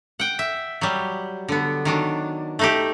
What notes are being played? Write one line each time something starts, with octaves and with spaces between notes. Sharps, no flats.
F#5 G5
E5
F#3 G3
D3 B3
D#3 F#3 D4
A3 D#4 G4